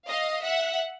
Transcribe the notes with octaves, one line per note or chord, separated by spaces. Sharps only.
D#5 F5
E5 F#5